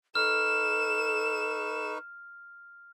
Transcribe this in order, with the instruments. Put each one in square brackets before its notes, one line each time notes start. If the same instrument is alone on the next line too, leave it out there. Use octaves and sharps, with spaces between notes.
[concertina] D#4 B4 C#6 [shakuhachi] A4 [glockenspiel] F6 [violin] E7